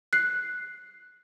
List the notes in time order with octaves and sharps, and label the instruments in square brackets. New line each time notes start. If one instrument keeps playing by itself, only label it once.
[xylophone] F#6 C7